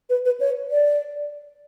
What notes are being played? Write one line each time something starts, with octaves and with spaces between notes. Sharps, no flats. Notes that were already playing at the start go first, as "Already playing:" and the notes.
B4
B4
C#5
D5